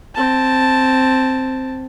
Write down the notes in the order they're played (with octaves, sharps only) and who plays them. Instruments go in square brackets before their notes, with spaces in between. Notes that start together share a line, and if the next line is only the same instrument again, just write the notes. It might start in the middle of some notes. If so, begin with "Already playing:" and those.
[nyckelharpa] C4 A5